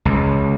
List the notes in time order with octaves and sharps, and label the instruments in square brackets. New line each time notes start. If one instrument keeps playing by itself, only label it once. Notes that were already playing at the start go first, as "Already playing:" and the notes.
[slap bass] C#2